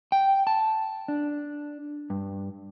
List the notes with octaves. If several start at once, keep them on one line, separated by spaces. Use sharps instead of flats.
G5
A5
D4
G2